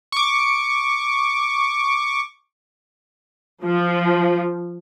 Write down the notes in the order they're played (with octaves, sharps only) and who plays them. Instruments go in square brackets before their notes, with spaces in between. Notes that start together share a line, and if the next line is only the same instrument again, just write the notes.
[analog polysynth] C#6 D6
[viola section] F3